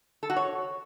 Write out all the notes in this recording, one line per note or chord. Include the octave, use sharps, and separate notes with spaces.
A4
F#4
C#5